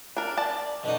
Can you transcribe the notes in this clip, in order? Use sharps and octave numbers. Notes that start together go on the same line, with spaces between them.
D4 A#4
D5 A5
B2 D3 D#4